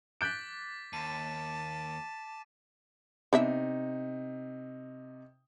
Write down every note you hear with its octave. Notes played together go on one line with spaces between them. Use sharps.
D6 F#6 G6 A6 B6 D7
D#2 A5 D#7
C3 B3 D4 D#4 E5